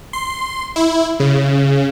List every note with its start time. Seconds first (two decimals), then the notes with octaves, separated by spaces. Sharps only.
0.13 C6
0.76 E4
1.20 C#3